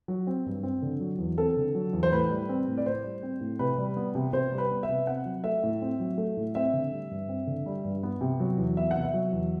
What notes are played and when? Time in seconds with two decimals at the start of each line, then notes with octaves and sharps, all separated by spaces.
0.08 F#3
0.27 C4
0.46 G2
0.63 C4
0.82 D3
1.00 F#3
1.19 E2
1.37 C4 A4
1.57 D3
1.75 F#3
1.93 E2
2.03 C5
2.12 A2 B4
2.30 G3
2.49 C4
2.68 A2
2.78 D5
2.86 A2 C5
3.04 G3
3.23 C4
3.41 A2
3.59 C3 B4
3.78 G3
3.97 B3
4.15 C3
4.33 C3 C5
4.52 G3
4.58 B4
4.71 B3
4.83 E5
4.89 C3
5.07 C4 F#5
5.25 F#3
5.44 A3 E5
5.63 A2
5.82 C4
6.00 F#3
6.18 A3
6.37 A2
6.55 C4 E5
6.73 D3
6.91 G3
7.11 G2
7.29 C4
7.47 D3
7.66 G3
7.84 G2
8.03 B3
8.21 C3
8.40 F#3
8.58 E2
8.77 B3 E5
8.91 C3 F#5
9.03 E5
9.14 F#3
9.32 E2